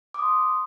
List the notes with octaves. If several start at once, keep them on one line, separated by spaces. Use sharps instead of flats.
C6 D6 D#6